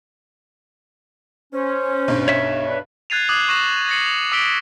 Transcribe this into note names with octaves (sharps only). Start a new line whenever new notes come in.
C#4 C5
B1 G2
C#5 E5
D4 B4
F#6 G#6 A6 C7 D#7 F7
D6 D#6 F#6 G#6 C7 F#7
C#6 F#6 A#6 E7 F#7
A6 A#6 C7 C#7 F#7
F7 F#7
D6 E6 B6 D7 G7